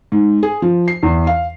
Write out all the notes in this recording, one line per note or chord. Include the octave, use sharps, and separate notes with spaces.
G#2
G#4
F3
C7
E2
F5